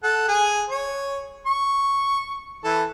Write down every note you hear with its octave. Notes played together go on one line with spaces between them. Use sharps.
A4 F#5
G#4 G#5
C#5
C#6
E3 A4